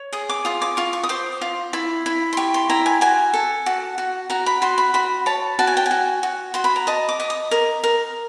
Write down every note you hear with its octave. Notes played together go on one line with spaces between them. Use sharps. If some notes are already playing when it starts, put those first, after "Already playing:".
Already playing: C#5
G#4 D#6
D6
F4 D#6
D6
F4 C#6
C#6
D#6
C5 D6
F4
E4
E4
C6
G4 C#6
C6
E4 A#5
G#5
F#4 G#5
A4
F#4
F#4
F#4 A#5
B5
F#4 C6
B5
F#4 B5
C#5 A5
F#4 A5
G#5
G5
G#5
F#4
F#4
F#4 C6
B5
A#5
D#5 A5
D6
D#5
D#6
A#4
A#4